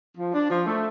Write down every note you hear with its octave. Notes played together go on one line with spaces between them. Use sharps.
F3
D4
F3
A3